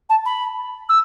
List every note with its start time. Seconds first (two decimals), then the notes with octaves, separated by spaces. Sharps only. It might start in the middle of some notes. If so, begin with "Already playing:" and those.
0.09 A5
0.25 B5
0.89 E6